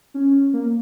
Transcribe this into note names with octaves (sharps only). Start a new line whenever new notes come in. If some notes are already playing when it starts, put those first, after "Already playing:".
C#4
A#3